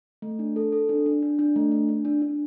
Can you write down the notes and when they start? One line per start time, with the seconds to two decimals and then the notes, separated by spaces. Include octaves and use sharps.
0.22 A3
0.39 D4
0.56 A4
0.72 A4
0.89 D4
1.06 D4
1.22 D4
1.39 D4
1.56 A3
1.72 D4
1.89 D4
2.05 D4
2.22 D4